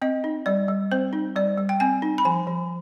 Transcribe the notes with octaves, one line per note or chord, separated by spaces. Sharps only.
C4 D#5
D#4
G3 D5
G3
C4 C5
D#4
G3 D5
G3
G5
C4 G#5
D#4
B5
F3 G#5
F3